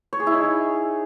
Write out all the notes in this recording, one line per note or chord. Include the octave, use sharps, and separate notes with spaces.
C#5
G#4
E4
D#4